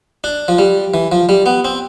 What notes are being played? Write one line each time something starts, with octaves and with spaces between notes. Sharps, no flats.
D4
F3
G3
E3
F3
G3
B3
C4